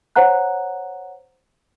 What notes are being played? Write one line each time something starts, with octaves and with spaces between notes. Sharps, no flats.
C5 C#5 F#5 A#5 F#6